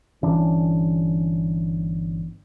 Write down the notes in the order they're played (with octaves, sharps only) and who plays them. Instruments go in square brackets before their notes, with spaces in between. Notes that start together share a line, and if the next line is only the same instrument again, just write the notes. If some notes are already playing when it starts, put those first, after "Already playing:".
[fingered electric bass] G1 E3 C#4 D4